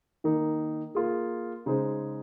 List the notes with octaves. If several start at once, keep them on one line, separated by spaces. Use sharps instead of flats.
D#3 A#3 D#4
A#3 F4 G#4
C#3 G#3 D#4 G#4 C5